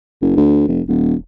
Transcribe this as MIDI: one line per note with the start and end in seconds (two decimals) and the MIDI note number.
0.22 0.33 30
0.37 0.64 38
0.68 0.81 29
0.88 1.14 27